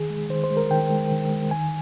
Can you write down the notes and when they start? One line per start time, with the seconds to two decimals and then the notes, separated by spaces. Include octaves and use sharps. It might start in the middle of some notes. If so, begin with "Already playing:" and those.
Already playing: D#3 G#4
0.10 G#3
0.30 D#3 C5
0.44 C5
0.50 G#3
0.57 A#4
0.70 D#3 G5
0.90 G#3
1.11 D#3
1.30 G#3
1.51 D#3 G#5